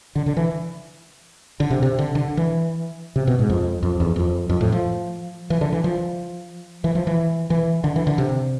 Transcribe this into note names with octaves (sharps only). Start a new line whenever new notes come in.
D3
D3
E3
D3
C3
C3
D3
D3
E3
C3
B2
G#2
F2
F2
E2
F2
F2
A2
F3
E3
D3
E3
F3
E3
F3
E3
E3
D3
E3
D3
C3